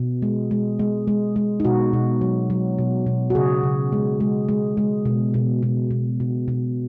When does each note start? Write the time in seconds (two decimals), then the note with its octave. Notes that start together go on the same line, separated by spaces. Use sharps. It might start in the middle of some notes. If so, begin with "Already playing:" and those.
Already playing: B2
0.22 G#3
0.51 G#3
0.79 G#3
1.07 G#3
1.36 G#3
1.60 D#4
1.65 B2 F#4
1.93 B2
2.21 F#3
2.50 F#3
2.78 B2
3.06 B2
3.30 F#4
3.35 C#3 G#4
3.63 C#3
3.92 G#3
4.20 G#3
4.49 G#3
4.77 G#3
5.06 B2
5.34 B2
5.63 B2
5.91 B2
6.20 B2
6.48 B2